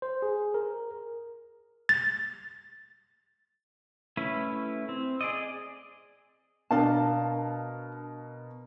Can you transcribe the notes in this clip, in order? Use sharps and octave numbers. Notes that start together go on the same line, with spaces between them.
C5
G#4
A#4
A6
A3 C#4 E4 B4
C4
G#4 D5 D#5
B2 D4 A#4 F5 A5